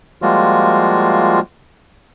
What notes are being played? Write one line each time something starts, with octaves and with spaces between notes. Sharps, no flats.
F3 G3 G#3 A#3 F4 F#4